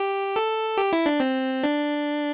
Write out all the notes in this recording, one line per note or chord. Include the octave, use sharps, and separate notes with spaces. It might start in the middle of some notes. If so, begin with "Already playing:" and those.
Already playing: G4
A4
G4
E4
D4
C4
D4